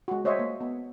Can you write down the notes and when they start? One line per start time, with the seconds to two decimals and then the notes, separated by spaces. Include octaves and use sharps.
0.08 G#3 F#4
0.24 A3 C5 C#5 D#5 E5
0.39 A#3
0.61 B3